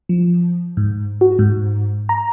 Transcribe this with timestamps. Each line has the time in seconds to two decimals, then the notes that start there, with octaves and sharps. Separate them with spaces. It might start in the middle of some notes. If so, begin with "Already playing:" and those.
0.09 F3
0.77 G#2
1.21 F#4
1.39 G#2
2.09 A#5